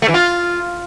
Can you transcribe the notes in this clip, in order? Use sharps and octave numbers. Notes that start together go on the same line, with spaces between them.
A3
E3
F4